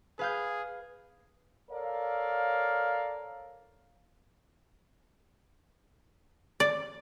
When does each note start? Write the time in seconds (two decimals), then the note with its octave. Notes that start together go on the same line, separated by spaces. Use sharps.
0.19 G#4 B4 F5 G6
1.71 A4 A#4 C#5 D5 F5
6.60 D5